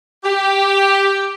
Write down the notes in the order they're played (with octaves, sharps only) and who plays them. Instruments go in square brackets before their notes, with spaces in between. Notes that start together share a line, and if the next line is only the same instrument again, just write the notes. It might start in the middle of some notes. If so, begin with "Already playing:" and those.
[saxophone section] G4